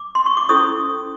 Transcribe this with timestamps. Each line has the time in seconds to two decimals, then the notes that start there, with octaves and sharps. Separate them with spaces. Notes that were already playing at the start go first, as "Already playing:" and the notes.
Already playing: D6
0.15 C6
0.26 C#6
0.37 D6
0.49 C#4 E4 A4 C5 C#6 D#6